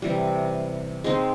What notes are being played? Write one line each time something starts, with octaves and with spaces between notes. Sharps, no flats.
C3 E3 G3
G#3 C4 D#4